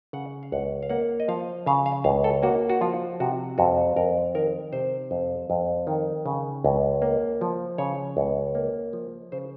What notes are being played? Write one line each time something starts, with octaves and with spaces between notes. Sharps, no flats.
C#3 F#5
F5
C#2 F#5
F5
A#3 F#5
D#5
F3 F5
C#3 F5
F5
C#2 F5
A4
A#3 F#4
F#4
F3 F4
C3 F#4
F2 F#4
F2 A#4
D#3 A#4
C3 C5
F2
F2
D#3
C#3
C#2
A#3
F3
C#3 C#5
C#2
A#3
F3
C#3 C5